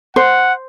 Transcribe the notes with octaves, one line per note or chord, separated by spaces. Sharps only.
C5 F#5